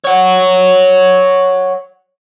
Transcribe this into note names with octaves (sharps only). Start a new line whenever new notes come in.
C#5 F#5